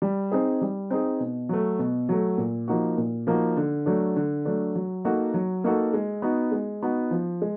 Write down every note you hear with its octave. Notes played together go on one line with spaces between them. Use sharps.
G3
C4 D#4 G#4
G3
C4 D#4 G#4
B2
F#3 A3
B2
F#3 A3
A#2
F3 A#3 D#4 F#4
A#2
F3 A#3 D#4 F#4
D3
F#3 A3 D4
D3
F#3 A3 D4
F#3
A#3 D#4 F#4 A4
F#3
A#3 D#4 F#4 A4
G#3
B3 D#4 F#4
G#3
B3 D#4 F#4
F3
G#3